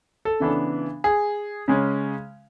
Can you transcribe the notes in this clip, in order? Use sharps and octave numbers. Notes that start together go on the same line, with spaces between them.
A4
C#3 E3 B3 D4
G#4
C#3 G#3 C#4